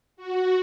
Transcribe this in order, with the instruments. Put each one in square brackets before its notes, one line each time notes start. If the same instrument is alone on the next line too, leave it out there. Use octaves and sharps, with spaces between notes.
[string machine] F#4